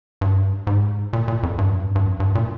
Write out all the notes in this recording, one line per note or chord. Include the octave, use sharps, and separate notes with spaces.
G2
G#2
A#2
A#2
F2
G2
F2
G2
G2
F2
G2
A#2